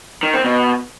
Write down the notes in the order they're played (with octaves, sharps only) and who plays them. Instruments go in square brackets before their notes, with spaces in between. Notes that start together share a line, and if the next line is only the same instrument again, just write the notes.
[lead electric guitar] D#3
C4
B2